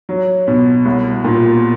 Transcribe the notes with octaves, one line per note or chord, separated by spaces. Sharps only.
F#3
B2
C2
A#2